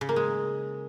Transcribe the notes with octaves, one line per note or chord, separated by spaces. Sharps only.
C#3
A#3
G#3